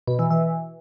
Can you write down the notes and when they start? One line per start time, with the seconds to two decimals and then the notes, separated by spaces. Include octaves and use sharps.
0.07 B2
0.19 E3
0.30 E3